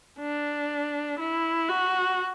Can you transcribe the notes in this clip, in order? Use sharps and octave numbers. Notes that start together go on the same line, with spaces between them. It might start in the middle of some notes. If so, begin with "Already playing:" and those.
D4
E4
F#4